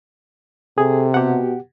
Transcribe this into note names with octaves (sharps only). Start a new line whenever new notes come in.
C3 G#4 A4
B2 G4 F#5